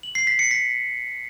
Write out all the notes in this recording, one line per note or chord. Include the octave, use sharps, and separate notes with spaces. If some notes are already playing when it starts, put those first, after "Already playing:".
F#7
C7
B6
C#7
B6